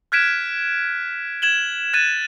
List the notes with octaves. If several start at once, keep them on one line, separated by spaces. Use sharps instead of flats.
F6 F#6 G#6 B6 D7 E7
G#6 E7 F#7 G7
F#6 G#6 A6 D#7 E7